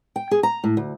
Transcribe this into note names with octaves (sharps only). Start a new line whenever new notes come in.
G5
G#4
A#5
A2
D2